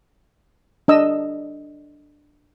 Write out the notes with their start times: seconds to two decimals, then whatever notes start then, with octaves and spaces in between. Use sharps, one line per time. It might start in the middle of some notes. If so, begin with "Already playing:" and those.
0.88 D4 D#5 E6